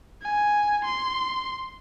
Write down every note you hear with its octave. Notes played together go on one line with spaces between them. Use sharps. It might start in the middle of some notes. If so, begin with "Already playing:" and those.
G#5
C6